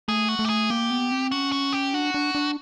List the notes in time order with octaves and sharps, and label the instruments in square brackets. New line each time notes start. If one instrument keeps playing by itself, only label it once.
[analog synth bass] A3 [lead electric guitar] G#4
[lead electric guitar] F#4
[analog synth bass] A3
[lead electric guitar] G4
G#4
[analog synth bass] A#3 [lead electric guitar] G4
[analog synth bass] B3
C4
[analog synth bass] C#4 [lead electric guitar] F#4
[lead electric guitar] F#4
G4
[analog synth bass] D4 [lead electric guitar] F#4
[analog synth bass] D4
D4